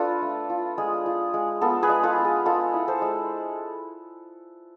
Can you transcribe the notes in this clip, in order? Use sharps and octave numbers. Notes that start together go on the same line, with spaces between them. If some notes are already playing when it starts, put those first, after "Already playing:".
Already playing: D4 F4 A4 B4
A3
F4
G#3 G#4
F4
G#3
B3 F4 A4
G#4 B4
G#3
F4 A4
F4
G#4
G#3 F4 A4
E4
A4 C5
G#3